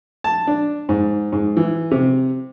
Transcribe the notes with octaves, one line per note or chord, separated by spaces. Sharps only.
A5
D4
G#2
G#2
E3
C3